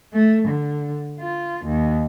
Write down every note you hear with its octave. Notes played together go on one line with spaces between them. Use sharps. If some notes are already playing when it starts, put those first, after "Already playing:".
A3
D3
F4
D#2